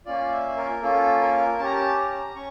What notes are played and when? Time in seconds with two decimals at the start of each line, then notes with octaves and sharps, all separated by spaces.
0.06 A#3 C#4 F4 D5
0.31 E5
0.57 A#4
0.82 A#3 C#4 F4 A4
1.21 A#4
1.59 C#4 A5
1.63 G4 A#5
1.73 A5
1.97 A#5
2.35 C#4 C#6